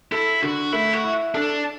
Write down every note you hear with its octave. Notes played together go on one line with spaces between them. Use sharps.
E4 A4
D3 F#4
A3 E4
F#4
E4
D4 A4